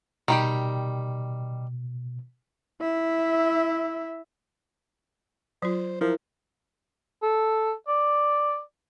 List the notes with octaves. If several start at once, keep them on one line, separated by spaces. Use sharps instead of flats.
B2 D#3 G3 G4
E4 E5
F#3 F4 C5
F3 E4 A#4
A4
D5